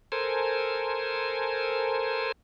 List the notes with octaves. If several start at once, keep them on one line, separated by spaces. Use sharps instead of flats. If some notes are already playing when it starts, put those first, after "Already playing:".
A4 A#4 C5 G#5